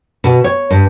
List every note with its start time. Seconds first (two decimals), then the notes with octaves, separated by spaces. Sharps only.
0.24 B2
0.44 C#5
0.70 G2